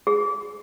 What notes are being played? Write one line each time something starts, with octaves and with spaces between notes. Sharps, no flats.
G#4